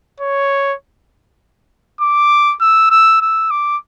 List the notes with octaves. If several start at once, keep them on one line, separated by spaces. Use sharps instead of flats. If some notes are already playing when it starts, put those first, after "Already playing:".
C#5
D6
E6
E6
E6
D6